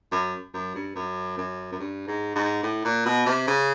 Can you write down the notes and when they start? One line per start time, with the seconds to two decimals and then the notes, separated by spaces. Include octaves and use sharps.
0.12 F#2
0.54 F#2
0.75 G2
0.95 F#2
1.38 F#2
1.72 F#2
1.79 G2
2.07 G#2
2.35 G#2
2.63 A2
2.84 A#2
3.05 B2
3.26 C3
3.47 C#3